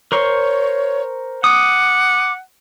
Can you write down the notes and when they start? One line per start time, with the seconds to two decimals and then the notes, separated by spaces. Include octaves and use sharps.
0.12 A#4 C5 C#5 C#6
1.44 F#5 D6 D#6